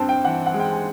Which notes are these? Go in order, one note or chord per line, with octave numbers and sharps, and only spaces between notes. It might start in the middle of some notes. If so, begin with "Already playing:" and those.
Already playing: G2 C4 A5
G5
E3 F#5
F#5
G#3
G5
G#5